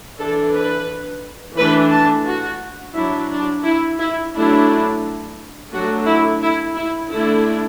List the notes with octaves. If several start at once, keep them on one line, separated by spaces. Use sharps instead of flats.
E3 D4 A4
B4
E3 A3 D4 B4
A5
F#4
F#3 D4 E4
D4
E4
E4
F#3 A3 D4 E4
F#3 A3 D4 F#4
E4
E4
E4
D3 A3 D4 E4